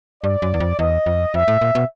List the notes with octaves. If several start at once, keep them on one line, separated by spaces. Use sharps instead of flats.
G2 D5
F#2
E2
F2
E2 D#5
F2
F2 E5
A2
A#2
B2